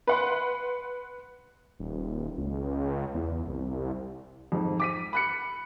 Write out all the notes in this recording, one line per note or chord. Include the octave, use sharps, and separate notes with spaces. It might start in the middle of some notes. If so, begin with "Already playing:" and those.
B4 F#5 C6
D#1
C#2
E2
C2
F2 G#2
D6 B6 D#7
B5 F#6 C#7